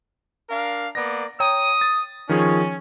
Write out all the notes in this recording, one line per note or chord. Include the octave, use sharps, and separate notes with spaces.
D4 A#4 F5
A#3 B3 D5 A#6
C#5 G5 A#5 D#6
A6
D#3 F3 C#4 G#4